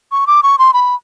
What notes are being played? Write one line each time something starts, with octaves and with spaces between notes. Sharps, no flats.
C#6
D6
C#6
C6
B5